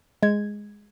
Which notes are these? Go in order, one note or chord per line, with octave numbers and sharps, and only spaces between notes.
G#3 G#6